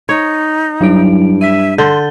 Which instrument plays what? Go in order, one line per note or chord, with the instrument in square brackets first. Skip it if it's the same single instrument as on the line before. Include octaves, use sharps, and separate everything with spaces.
[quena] D#4 [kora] C#5
[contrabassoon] G2 [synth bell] F#3 E4 D7
[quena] E5 [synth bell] B6 D#7
[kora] D3 [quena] C6 [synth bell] G6 A6 G7